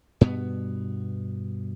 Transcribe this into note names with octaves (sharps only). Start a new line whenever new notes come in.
G2 B2 B3